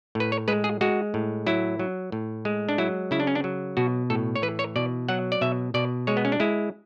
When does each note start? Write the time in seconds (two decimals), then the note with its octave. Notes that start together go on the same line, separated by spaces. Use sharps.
0.15 A2
0.20 B4
0.32 C#5
0.48 G#3 B4
0.64 G#4
0.81 G#3 F#4
1.14 A2
1.47 F#3 E4
1.79 F#3
2.12 A2
2.45 G#3
2.69 D4
2.78 F#3 E4
3.11 C#3 E4
3.20 D4
3.27 C#4
3.35 D4
3.44 F#3
3.77 B2 F#4
4.10 A2 A4
4.35 C#5
4.42 E3 B4
4.59 C#5
4.76 B2 D5
5.09 F#3 F#5
5.32 D5
5.41 B2 E5
5.74 B2 D5
6.07 G#3 C#5
6.17 B3
6.25 C#4
6.32 D4
6.40 G#3 E4